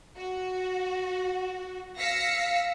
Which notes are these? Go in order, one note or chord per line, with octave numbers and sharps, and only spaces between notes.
F#4
F5 E6 A#6 B6 C#7